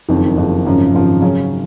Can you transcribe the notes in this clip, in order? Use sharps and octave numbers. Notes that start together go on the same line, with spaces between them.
F#1 F2 D#3
F#1 F2 D#3
G#1 F#2 C#3 F3
G#1 F#2 C#3 F3
C#3 F#3 C#4